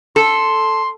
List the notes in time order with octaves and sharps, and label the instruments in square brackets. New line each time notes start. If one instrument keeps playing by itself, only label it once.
[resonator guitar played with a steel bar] A4 [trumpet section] C6